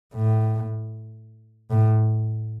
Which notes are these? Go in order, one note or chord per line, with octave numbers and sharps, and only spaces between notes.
A2
A2